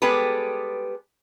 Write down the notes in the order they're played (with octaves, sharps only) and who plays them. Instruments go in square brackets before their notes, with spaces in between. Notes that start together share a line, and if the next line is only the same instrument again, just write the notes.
[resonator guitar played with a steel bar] G3 G#3 B3 G4 A4 B4